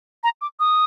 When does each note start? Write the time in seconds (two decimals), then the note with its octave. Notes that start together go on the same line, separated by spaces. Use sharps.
0.24 A#5
0.41 D6
0.60 D#6